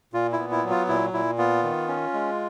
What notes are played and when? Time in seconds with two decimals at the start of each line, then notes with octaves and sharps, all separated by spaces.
0.13 A#2 F4
0.33 E4
0.39 B3
0.51 E4
0.64 F#3
0.70 F4
0.88 A#2 E4
1.13 A#2 E4
1.38 B3 F4
1.63 D#3
1.88 C#4
2.13 G#3